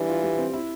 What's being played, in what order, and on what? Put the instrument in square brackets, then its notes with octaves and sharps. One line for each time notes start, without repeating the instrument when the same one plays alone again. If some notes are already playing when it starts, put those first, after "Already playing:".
Already playing: [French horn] E3 [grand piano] G3 D4
[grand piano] F4
G3
C4
E4